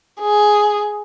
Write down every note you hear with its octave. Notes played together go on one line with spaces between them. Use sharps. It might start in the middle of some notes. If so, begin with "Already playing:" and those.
G#4